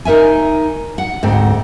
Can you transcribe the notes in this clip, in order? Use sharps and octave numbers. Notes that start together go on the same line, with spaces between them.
D#4 A#4 E5 G#5
F#5
D2 G#2 C4